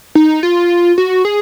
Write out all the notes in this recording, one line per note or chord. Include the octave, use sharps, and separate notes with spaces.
D#4
F4
F#4
G#4